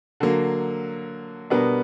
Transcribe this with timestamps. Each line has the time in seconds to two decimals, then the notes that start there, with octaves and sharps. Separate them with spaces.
0.20 D3 F#3 A#3
1.50 B2 G3 B3 D4 A#4